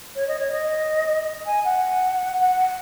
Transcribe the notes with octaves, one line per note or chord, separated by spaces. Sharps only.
C#5
D#5
C#5
D#5
G#5
F#5
F#5